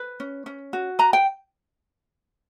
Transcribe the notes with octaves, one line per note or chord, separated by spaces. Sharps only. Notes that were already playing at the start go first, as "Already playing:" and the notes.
Already playing: B4
C#4
C#4
F#4
B4 A#5
G5